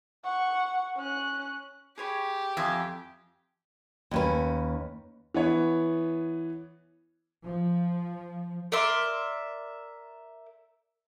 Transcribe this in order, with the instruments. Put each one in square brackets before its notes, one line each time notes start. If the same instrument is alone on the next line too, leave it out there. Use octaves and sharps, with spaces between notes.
[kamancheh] F#5 C#6
C#4 F#6
[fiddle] G4 [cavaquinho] G#4 C#5 B5
[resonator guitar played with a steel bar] F2 [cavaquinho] E5 G#5 C6
[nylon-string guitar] D#2 C#4 B4
[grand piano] E3 B3 C#5
[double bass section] F3
[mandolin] A#4 D5 E5 C6